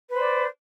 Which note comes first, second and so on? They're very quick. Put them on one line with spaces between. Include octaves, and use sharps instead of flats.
B4 C5 D5